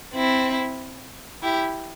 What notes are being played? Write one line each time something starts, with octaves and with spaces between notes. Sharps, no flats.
C4 E4
E4 G4